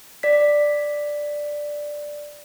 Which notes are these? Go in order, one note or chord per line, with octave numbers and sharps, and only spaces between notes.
D5 B6